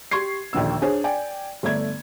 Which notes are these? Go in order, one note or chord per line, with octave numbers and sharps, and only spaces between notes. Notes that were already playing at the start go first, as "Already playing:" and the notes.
G4 C6 C#6 G#6 C7
A#1 D#2 D3 E6
D4 G#4 C5 C#5
D5 G5 G#5
G1 A3 D5 G#6